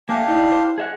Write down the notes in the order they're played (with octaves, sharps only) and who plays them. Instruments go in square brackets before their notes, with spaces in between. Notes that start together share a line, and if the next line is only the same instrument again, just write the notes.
[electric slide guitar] A3 A#3 [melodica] D4 G4 F5 [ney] G#5
[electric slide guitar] D#4 D5 [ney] E4
[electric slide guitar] C5
G#4 E5 F#5